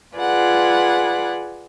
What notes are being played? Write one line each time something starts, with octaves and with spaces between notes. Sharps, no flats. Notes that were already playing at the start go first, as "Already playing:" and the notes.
F4 G#4 B4 D5 F#5